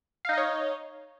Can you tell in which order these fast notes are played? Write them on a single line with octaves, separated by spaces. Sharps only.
F5 D#4 D#5 C#5